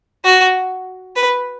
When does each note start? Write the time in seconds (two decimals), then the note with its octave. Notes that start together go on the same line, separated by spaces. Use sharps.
0.24 F#4
1.16 B4